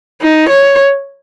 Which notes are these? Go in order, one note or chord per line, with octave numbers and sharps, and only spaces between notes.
D#4
C#5